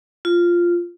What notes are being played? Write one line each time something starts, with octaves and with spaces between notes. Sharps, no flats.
F4